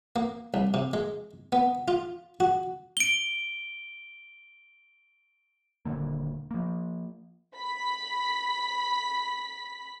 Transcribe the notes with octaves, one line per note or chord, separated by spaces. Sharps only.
A#3
C2
C3
G#3
B3
F4
F#4
D7 G7
D#1 D#2 D3 A#3
F3 A#3
B5 B6